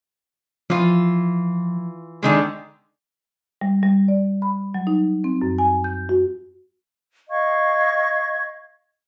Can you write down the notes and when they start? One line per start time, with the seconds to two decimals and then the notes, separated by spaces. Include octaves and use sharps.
0.70 E3 F3 F4
2.23 D3 D#3 G#3
3.61 G3
3.83 G3
4.08 D5
4.42 B5
4.74 F#3
4.87 D#4
5.24 C4
5.42 F#2
5.58 G#5
5.84 G6
6.09 F#4
7.30 D#5 F5 C#6 G#6